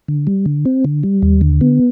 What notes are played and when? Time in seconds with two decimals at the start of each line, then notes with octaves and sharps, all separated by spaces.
0.08 D3
0.27 G3
0.46 D3
0.66 C4
0.85 D3
1.03 G3
1.22 D#2
1.41 D3
1.61 B3